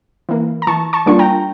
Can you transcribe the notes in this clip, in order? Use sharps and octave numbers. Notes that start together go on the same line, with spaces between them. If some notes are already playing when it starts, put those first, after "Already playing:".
E3 A#3
A#5
E3 A5 C#6
A5 C#6
G3 A#3 D4 F4 C#6
G5 A#5